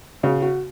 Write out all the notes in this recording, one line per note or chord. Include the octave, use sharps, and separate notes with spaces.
C#3 F#4
F#4